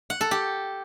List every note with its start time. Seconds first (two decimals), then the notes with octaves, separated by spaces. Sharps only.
0.10 F#5
0.21 A4
0.31 G4